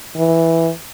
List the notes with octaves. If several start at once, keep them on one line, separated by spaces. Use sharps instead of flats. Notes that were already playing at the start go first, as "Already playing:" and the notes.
E3